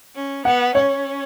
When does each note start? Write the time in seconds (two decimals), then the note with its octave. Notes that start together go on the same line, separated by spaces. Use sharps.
0.15 C#4
0.45 B3 F#5
0.75 C#4 C#5